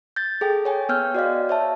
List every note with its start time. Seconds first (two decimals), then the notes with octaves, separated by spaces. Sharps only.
0.16 G6 A6
0.41 G#4 A4 G5
0.65 C#5 G5 G#5
0.89 B3 C#5 F6 G6
1.15 F#4 D5 D#5 F5
1.49 C#5 E5 A5